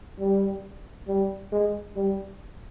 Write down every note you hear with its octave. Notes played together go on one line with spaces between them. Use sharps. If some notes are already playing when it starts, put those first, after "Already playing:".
G3
G3
G#3
G3